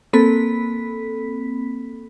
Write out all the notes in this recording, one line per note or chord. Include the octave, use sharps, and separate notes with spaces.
A#3 C4 A4 B5 B6